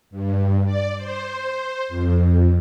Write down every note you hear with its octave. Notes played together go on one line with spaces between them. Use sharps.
G2
D5
C5
F2